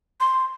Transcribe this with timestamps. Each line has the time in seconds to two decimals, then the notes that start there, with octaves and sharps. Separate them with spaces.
0.21 C6